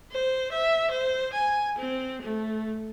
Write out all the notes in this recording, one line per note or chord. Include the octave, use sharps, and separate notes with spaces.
C5
E5
C5
G#5
C4
A3